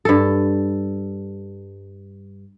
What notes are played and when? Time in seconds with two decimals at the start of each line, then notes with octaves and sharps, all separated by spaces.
0.05 G2 A4